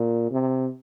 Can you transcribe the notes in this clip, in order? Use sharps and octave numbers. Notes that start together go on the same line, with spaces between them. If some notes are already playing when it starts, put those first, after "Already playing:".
Already playing: A#2
C3